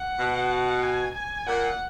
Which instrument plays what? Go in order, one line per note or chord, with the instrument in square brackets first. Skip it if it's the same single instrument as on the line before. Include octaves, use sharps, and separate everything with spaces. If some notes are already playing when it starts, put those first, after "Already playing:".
Already playing: [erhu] F#5
[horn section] B2
[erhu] G#5
G#5
[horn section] A#2 [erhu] F#5